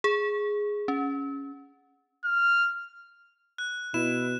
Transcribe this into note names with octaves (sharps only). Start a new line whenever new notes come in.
G#4
C#4
F6
F#6
B2 E4 E7